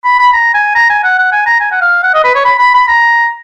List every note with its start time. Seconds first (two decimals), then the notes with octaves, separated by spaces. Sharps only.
0.04 B5
0.19 B5
0.33 A#5
0.54 G#5
0.75 A#5
0.90 G#5
1.04 F#5
1.18 F#5
1.32 G#5
1.46 A#5
1.60 G#5
1.72 F#5
1.81 F5
2.03 F#5
2.14 D#5
2.24 B4
2.35 C#5
2.45 B5
2.59 B5
2.74 B5
2.88 A#5